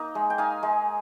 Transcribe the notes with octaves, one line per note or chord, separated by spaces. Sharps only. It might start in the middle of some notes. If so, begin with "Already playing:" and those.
Already playing: A#3 D#4
G#3
G5
D#4 F5 G#5
G#3